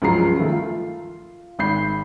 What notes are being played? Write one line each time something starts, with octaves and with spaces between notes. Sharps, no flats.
C#2 G2 F3 F#3 A#5 C7
D#3 F3 A3
F4
G#1 B5 G6 C7